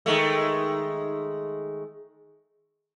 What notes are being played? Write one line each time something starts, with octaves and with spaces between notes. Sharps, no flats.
D#3 G#3 A3